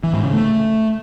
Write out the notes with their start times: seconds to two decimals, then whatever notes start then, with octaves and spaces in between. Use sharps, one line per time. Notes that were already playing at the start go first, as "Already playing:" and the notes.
0.04 E3
0.13 G#2
0.23 C#3
0.33 A3